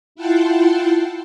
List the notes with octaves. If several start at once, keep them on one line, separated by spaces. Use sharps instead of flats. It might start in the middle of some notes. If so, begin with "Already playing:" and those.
E4 F4 F#5 G5 A5 C6